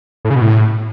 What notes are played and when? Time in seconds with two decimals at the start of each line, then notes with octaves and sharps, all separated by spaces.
0.25 A2
0.30 C#3
0.36 B2
0.42 A2